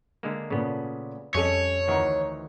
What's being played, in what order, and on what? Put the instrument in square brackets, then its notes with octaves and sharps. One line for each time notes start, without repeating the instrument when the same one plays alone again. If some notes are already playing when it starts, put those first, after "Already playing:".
[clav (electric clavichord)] D3 G#3 A#3
[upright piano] A#2 A3 [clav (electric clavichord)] C#3 B3
[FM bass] F2 [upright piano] G3 A4 F7 [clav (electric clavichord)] C#4 D#5 [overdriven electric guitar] C#5
[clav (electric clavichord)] D2 D#3 E3 [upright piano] F#5 A#5